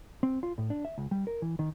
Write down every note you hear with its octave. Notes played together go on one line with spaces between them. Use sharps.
C4
F4
A2
D4
E5
C#2
G3
A#4
E3
D#3